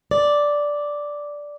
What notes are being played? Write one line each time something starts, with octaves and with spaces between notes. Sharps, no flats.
D5